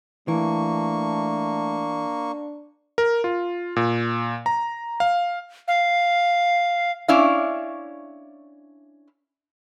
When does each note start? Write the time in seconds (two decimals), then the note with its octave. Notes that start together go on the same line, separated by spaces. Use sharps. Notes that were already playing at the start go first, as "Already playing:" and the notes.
0.28 E3 A3 A#3 D4 C#6
2.98 A#4
3.24 F4
3.76 A#2
4.46 A#5
5.00 F5
5.68 F5
7.08 C#4 D4 E4 D5 F5